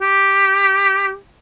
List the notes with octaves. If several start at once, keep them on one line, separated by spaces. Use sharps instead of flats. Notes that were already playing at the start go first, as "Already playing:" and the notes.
G4